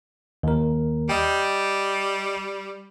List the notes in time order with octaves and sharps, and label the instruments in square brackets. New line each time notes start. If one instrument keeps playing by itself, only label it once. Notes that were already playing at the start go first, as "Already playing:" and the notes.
[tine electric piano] D#2 A#4
[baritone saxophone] G3 [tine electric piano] D#5 G5